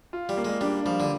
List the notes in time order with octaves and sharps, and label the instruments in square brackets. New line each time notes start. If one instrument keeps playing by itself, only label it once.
[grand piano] F4
[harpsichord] G3
[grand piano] A#3
[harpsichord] G#3
[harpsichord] G3 [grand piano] D4
[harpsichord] F3 [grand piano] G3
[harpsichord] D3